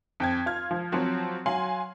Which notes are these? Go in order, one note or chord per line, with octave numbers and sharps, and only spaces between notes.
F2 G5 G#6
F4 F6 G#6
F3
F3 F#3 C4 F#4
F#3 F5 G#5 C6 F#7